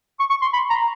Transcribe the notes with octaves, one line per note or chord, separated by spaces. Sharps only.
C#6
C#6
C6
B5
A#5